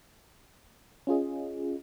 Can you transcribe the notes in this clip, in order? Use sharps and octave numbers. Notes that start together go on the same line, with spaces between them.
C#4 F4 G#4 D#5